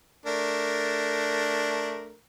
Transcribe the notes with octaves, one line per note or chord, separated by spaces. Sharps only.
A3 D4 A#4